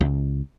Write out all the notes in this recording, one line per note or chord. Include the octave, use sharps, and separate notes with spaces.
C#2